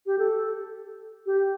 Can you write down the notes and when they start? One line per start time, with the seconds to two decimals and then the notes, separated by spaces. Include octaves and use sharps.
0.06 G4
0.19 A4
1.26 G4